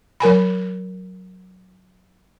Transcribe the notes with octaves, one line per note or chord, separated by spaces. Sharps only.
F#3 A#4 G#5 B5